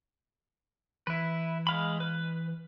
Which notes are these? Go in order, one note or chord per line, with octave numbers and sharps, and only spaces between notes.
E3 E4 B4
G#3 F5 B5
B4